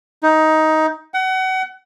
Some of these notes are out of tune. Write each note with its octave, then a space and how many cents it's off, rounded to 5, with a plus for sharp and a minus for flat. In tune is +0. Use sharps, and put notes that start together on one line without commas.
D#4 +15
F#5 +30